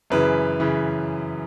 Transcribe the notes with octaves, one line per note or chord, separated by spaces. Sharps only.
F#2 C#3 E3 B4
C#3 E3